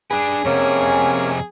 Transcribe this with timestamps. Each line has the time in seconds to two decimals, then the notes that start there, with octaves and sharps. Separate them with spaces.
0.11 D4 G#4 B4
0.45 F2 C3 A#3 C#4 C#5